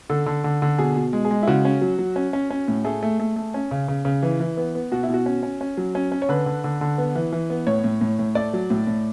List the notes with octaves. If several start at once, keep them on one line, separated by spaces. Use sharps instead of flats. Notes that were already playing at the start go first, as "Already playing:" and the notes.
D3 A4
D3
D3
D3
B2 G#4
B2
G#3
G#4
G#3
E4
C#3 F#4
C#4
F#3
F#3
C#4
C#4
C#4
A2
A3 G#4
A3
A3
A3
C#4
C#3
C#3
C#3
E3
E3
B3
B3
B2 F#4
E4
B2
F#4
C#4
C#4
C#4
F#3
C#4
C#4
C#5
D3 B4
D3
D3
D3
B3
E3
E3
B3
A2 C#5
A2
A2
A2
A3 D5
F#3
A2
A2